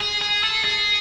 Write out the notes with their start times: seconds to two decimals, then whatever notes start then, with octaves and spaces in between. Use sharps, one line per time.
0.01 G#4
0.22 G#4
0.44 A4
0.64 G#4